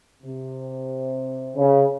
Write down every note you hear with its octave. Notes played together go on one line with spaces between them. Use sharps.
C3
C#3